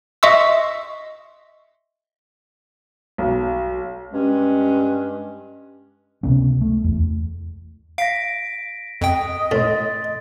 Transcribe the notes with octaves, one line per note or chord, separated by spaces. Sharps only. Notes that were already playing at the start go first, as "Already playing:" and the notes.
D#5 E5 C6 C#6 E6
B1
G2 G#3 C#4
C#2 C3 B3 C#4
A3
E2
F5 A#6 B6 D7
F2 D#5 G5
A2 C6 A6